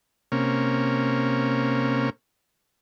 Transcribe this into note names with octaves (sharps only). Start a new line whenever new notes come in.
C3 A#3 C#4